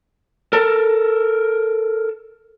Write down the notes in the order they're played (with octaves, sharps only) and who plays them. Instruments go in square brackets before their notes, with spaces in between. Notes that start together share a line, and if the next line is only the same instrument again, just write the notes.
[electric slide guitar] A4 A#4